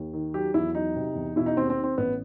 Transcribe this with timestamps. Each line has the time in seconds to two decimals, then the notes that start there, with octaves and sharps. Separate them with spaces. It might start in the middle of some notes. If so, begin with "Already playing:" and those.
Already playing: D#2
0.13 D#3
0.34 F#3 G4
0.54 E2 E4
0.75 F#3 D#4
0.96 C3
1.15 E2
1.36 B2 E4
1.46 D#4
1.56 D#2 C4
1.70 C4
1.77 D#3
1.84 C4
1.98 A1 B3